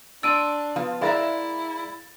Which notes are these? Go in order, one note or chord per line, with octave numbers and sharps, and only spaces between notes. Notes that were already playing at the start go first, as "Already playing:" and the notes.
D4 C6 E6 A6 D7 D#7
F3 B3 F4
G#3 E4 A#4 D5 E5 F5 A6